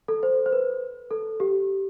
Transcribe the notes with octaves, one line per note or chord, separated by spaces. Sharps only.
A4
C5
C5
B4
A4
G4